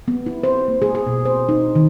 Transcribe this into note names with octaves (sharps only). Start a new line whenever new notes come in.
B3
E4
C5
A#3
G#4
G#4
B2
C5
D#4
D#3